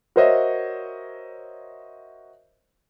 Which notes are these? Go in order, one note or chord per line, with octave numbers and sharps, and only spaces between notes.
F#4 A#4 C5 C#5 D#5 E5